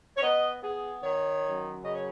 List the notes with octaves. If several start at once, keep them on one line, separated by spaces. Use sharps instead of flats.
C#5
B3 D#5
B3 G#4
D#3 C#5
F#2
C#3 D#5
C#5